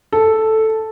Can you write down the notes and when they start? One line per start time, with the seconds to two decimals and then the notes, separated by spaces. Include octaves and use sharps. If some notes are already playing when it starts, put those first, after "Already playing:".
0.13 A4